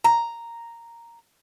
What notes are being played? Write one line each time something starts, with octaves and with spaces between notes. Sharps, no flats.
A#5